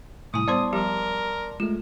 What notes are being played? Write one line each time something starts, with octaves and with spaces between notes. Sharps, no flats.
A2 C3 G3 E4 G#5 D#6
G3 B3 C5 D5 A5 C6
F3 G3 G4 A#4
G#3 A3 F4